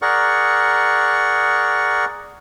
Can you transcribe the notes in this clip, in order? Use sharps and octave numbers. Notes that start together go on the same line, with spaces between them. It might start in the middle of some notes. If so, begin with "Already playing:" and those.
G#4 A#4 D5 F#5 C#6